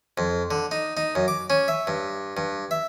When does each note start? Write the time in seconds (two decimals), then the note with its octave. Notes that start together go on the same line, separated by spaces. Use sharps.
0.18 F2
0.51 D3
0.71 D#4
0.97 D#4
1.15 F#2
1.28 D6
1.50 C#4
1.68 E5
1.87 G2
2.37 G2
2.71 E5